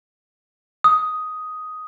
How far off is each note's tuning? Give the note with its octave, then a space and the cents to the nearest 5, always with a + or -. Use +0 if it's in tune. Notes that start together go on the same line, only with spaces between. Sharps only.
D#6 +5